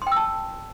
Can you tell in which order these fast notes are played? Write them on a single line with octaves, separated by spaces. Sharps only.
C6 G5 E6 A5